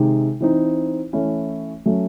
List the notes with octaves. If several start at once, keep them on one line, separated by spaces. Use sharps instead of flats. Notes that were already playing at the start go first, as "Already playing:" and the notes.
Already playing: C3 D#3 G#3 D#4
E3 C4 D#4
E3 A3 C#4 E4
F#3 A3 C#4